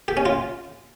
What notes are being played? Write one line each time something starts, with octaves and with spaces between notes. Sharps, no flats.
G4
C#4
F4